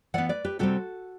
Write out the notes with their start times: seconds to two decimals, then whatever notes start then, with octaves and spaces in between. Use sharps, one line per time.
0.14 E3 B3 D5 F#5
0.29 B4 D5
0.45 G4 B4
0.59 C3 G3 C4 F#4 A4